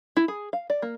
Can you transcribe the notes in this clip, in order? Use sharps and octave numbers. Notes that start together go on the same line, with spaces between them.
E4
G#4
F5
D5
A#3